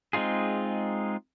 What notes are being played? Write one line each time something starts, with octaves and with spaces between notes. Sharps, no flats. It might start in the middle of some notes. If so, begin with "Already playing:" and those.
G#3 C4 D#4 F4 G#4